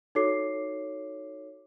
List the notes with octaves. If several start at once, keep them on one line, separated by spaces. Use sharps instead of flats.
D#4 F#4 A4 C#5 D6 C7